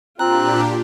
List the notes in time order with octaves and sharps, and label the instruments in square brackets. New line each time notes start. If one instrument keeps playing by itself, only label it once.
[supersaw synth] A#2 D4 G4 [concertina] C4 F#6 [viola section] F4 [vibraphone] A#5